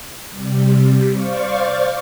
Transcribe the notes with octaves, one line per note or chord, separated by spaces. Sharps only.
C3 G3
C5 D5 F5 C#6